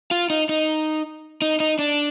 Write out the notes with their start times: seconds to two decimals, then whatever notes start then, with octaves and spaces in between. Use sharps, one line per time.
0.11 F4
0.30 D#4
0.49 D#4
1.42 D#4
1.60 D#4
1.79 D4